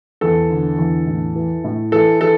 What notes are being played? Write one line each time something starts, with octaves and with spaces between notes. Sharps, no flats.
E2 A4
D3
E2
A2
E3
A2
E3 A4
E3 A4